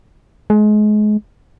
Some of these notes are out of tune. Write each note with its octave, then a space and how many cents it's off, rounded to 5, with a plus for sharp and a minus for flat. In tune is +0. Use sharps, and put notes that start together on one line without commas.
G#3 +30